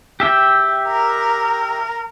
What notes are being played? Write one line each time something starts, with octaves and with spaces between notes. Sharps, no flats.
G4 E5 G5
A#4